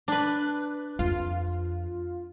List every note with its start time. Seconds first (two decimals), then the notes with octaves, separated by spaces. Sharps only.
0.08 D4 B4
0.99 F2 F4